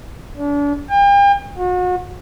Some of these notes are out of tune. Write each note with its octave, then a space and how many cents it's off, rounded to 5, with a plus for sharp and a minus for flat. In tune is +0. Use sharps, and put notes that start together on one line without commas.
D4 -35
G5 +40
F#4 -35